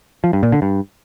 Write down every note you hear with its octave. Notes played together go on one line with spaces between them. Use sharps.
F3
G2
A#2
D3
G2